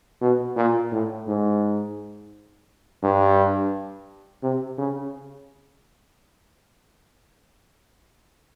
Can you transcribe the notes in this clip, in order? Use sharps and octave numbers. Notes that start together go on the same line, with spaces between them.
B2
A#2
A2
G#2
G2
C3
C#3